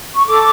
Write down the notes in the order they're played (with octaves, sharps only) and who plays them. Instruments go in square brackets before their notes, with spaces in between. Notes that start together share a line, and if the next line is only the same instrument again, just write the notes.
[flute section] C#6
A4 D6